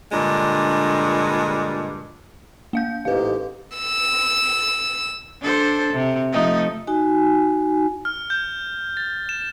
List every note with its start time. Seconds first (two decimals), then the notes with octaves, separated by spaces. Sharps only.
0.12 G2 A#2 D3 G#3 D4
2.73 A#3 F5 G6
3.05 A1 G#2 G4 B4 F5
3.78 E6
5.41 D4 A4 C5
5.93 C3
6.32 F3 A3 D#4
6.87 D#4 F#4 G#5
8.05 F6
8.30 G6
8.97 A6
9.29 E7